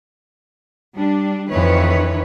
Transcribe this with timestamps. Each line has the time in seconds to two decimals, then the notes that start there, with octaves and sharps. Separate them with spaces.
0.94 G3 D4
1.50 F2 D#3 E3 B4 C#5